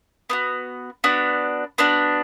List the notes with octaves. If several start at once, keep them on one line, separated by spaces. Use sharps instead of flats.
B3 D4 F#4
B3 D4 F#4
B3 D4 F#4